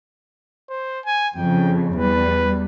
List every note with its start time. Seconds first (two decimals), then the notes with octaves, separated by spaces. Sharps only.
0.70 C5
1.05 G#5
1.36 F2 C#3 G5
1.96 E2 G3 B4